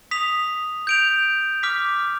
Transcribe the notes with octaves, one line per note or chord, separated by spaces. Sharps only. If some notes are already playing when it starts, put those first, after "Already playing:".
D#6 B6 F7
G6 D7 F7
D6 F6 B6